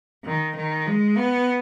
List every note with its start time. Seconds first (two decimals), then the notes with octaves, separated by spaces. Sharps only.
0.25 D#3
0.56 D#3
0.87 G#3
1.17 B3